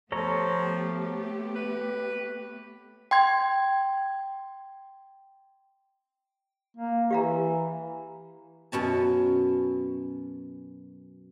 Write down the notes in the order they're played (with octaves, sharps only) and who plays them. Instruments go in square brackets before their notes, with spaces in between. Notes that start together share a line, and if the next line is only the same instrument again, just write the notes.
[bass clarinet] F3 [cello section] A3 B3 G4 [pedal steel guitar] A4 C#5 A#5
[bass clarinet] B4
[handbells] G5 C6 G#6
[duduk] A#3
[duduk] E3 [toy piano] G4 F5 A#5
[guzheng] F#2 B2 C#4 A5